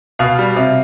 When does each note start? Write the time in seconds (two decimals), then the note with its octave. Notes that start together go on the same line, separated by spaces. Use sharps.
0.19 B2 F5
0.39 G3
0.56 C3